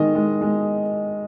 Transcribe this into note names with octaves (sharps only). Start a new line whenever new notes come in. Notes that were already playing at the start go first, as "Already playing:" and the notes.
Already playing: D#3 G#3 D#5
G#3
G#3